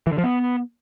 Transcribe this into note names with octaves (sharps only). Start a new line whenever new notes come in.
E3
D3
F3
B3